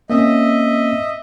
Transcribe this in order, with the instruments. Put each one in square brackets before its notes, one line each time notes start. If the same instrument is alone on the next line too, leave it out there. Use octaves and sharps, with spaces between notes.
[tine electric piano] A#3 C4 C#4 [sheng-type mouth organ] D#5 E5